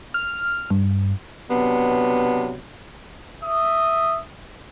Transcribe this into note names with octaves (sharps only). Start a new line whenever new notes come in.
F6
G2
C3 F#3 B3 D4
E5 D#6